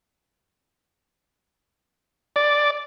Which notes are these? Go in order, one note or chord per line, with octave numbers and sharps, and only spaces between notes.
D5